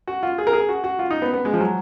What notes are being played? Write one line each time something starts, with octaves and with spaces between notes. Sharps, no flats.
F#4
F4
G#4
A#4
G#4
F#4
F#4
F4
D#4
B3
B3
G#3
F3
F#3